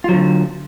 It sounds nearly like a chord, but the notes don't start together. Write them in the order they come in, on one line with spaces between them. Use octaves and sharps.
F4 F#3 D3